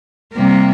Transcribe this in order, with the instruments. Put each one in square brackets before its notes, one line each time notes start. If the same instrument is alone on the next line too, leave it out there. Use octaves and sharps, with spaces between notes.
[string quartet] C3 G3 A#3